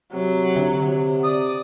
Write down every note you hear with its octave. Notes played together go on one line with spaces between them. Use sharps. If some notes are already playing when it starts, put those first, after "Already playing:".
C3 F#3
D3
D5 D#6